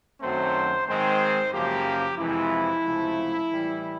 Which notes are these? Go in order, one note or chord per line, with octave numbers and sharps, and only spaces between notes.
F#2 D#3 F#3 A3 C4 C5
G#2 D#3 G#3 C4 C5
F#2 C#3 F3 A#3 G4
F2 C3 E3 G#3 E4
C#2 C3 F3 A3
A2 E3 G3